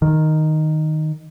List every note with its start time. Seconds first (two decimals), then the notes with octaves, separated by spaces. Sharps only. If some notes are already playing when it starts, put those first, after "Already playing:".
0.02 D#3